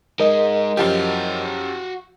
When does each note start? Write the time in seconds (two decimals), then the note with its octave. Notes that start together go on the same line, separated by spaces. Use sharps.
0.20 G#3 D#4 A#4 D#5
0.77 F#2 F3 F#4 G4 F5